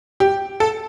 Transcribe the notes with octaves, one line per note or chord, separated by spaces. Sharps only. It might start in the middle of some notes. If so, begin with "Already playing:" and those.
G4
A4